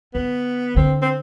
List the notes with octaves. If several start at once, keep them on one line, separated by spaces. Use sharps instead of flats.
D3 B3
D3 C4
C4